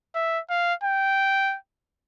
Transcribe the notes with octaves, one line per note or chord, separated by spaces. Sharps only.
E5
F5
G5